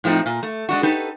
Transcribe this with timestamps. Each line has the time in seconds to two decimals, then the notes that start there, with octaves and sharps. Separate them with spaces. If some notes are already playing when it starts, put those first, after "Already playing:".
0.04 A2 F3 A3 C4 D#4
0.26 A#2
0.43 A3
0.69 G#3 D4 F#4
0.83 D#4 G4 A4 B4